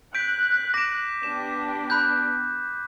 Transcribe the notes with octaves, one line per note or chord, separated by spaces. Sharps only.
F#6 G6 B6 D7
D6 A#6 D7 E7
B3 D4 G4 E7
B5 F#6 G6